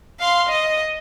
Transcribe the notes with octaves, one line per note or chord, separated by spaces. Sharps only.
F5 C6
D#5